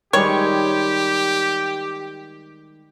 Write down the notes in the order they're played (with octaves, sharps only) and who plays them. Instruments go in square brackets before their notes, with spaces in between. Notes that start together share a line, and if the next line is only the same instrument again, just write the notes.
[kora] D#3 G3 G#3 [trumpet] G4 [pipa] C#5